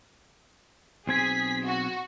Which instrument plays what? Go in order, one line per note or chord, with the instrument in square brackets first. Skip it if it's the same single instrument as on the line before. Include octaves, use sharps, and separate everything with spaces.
[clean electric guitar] B1 C4 G#5 [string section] G#4 B6
[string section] F#4